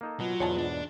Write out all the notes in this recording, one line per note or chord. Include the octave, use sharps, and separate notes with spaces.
A#3 D#4 A4
B2 F#3 F4
E2 G#2 B2 C#5 G#5 A5
D4